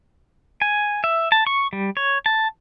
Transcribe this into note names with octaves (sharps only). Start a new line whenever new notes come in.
G#5
E5
A5
C#6
G3
C#5
A5